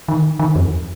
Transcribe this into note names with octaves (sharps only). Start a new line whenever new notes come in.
D#3
D#3
F2